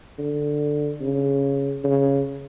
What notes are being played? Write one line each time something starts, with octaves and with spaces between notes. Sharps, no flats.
D3
C#3
C#3